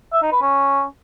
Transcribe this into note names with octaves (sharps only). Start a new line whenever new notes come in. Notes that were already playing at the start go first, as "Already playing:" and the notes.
E5
D#4
B4
C#4